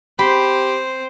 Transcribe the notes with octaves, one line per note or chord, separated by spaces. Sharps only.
C4 G4 C5 B5